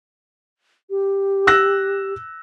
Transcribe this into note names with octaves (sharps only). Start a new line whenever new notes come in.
G4
E6 F#6 A#6